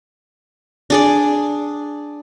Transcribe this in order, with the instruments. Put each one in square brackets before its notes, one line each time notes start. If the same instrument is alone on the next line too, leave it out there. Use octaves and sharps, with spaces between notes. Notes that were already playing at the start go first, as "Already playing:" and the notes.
[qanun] D4 G#4 D5